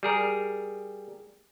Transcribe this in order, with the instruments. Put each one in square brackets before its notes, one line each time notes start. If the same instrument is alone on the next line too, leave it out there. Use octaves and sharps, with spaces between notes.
[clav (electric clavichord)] G3 G#4 A#4